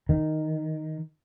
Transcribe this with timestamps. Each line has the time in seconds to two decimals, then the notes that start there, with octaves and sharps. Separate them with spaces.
0.09 D#3